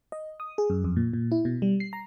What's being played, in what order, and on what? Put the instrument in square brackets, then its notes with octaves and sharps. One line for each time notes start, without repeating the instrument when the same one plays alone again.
[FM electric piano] D#5
D#6
G#4
F#2
F2
A#2
A#2
E4
B2
G3
C7
A#5